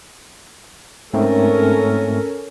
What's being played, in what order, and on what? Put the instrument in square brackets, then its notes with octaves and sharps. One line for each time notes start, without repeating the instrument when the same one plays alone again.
[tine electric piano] G#2 A3 C4 [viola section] C#4 A4 A#4